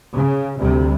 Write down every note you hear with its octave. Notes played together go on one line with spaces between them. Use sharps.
C#3
D2 C3 G3